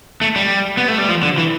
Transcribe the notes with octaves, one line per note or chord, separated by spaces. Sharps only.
A3
G3
B3
A3
G3
F3
D3
E3